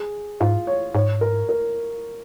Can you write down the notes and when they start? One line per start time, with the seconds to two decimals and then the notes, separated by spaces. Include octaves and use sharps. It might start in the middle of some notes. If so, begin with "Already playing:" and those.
Already playing: G#4
0.40 G#2 F4
0.67 C#5
0.95 G#2 C#5
1.21 A#4
1.49 A#4